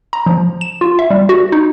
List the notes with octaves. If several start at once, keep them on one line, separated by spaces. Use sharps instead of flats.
A#5
F3
E7
F4
E5
G3
F#4
D#4